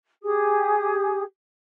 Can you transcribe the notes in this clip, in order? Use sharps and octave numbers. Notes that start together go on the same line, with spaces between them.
G4 G#4 D#6